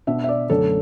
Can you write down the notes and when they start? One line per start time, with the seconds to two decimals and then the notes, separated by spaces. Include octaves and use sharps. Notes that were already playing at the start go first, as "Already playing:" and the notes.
0.07 B2 B3 D4 E5
0.24 E5
0.29 D5
0.50 F#2 D3 A3 D4 A4